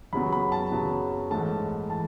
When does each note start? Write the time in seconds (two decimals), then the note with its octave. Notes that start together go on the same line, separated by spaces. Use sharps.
0.13 F#2 C#3 F#3 B3 B5
0.32 B5
0.52 A5
0.72 F#2 C#3 F#3 B3
1.31 G#2 E3 A3 A5
1.90 E3 A5